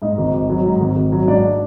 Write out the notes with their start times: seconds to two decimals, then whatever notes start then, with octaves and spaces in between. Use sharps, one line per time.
0.02 G#2 D#4 D#5
0.18 G#1
0.34 G#1
0.50 F#3
0.66 G#2
0.81 G#1
0.96 G#1
1.12 F#3
1.27 G#2 D4 D5